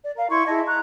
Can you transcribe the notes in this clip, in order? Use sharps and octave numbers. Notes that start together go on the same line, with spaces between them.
D5
A#4 F5 A#5
E4 C6 C#6 G#6
E4 G#4 D#5 A5
A#5 F#6